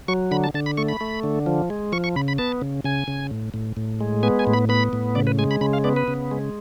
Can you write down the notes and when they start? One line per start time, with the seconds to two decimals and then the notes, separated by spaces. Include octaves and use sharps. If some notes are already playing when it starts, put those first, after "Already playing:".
0.08 F#3 C#6
0.31 D3 B5
0.44 A5
0.54 D3 A5
0.66 B5
0.78 A3 C#6
0.89 B5
1.01 A3
1.23 D3
1.46 F3
1.70 G#3
1.92 F3 C#6
2.04 C#6
2.16 C#3 B5
2.28 B5
2.38 B3 A5
2.62 C#3
2.84 C#3 G#5
3.08 C#3
3.31 A2
3.54 A2
3.77 A2
4.01 G#3
4.23 B3 G#5
4.39 G#5
4.47 A2
4.53 B5
4.69 B3 B5
4.93 A2
5.15 C#3 D5
5.27 B4
5.39 G#3 G#5
5.51 B5
5.61 C#3 B5
5.73 F5
5.84 B3 D5
5.96 B4
6.08 C#3
6.31 G#3